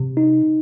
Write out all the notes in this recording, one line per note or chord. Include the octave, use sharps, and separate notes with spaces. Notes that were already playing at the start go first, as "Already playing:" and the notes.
Already playing: C3
D#4